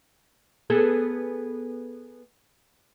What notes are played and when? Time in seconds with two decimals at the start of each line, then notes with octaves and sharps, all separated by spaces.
0.70 B3 G#4 A4